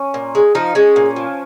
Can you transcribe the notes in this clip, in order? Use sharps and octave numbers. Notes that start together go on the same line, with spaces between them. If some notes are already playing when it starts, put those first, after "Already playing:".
Already playing: C#4
A#2
G#3
F3 D#4
G#3 C#4
A#2
F3